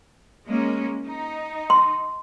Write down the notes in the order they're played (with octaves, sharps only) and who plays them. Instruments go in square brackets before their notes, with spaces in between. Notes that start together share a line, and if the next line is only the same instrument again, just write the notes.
[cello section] G#3 A#3 C#4
D#4
[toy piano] C6